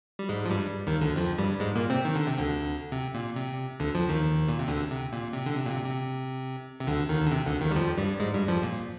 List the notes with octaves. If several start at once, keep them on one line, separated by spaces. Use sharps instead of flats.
G3
G#2 G#3
F3
G2 G3
D#2 D#3
D2 D3
F2 F3
G2 G3
G#2 G#3
A#2 A#3
C3 C4
D#3
D3
C3
D2 D3
C3
A#2
C3
D2 D3
F2 F3
D#2 D#3
A#2
C3
D2 D3
C3
A#2
C3
D3
C3
A#2
C3
C3
C3
D2 D3
D#2 D#3
D3
C3
D2 D3
D#2 D#3
G3
F2 F3
G2 G3
G#2 G#3
G2 G3
F2 F3
A#2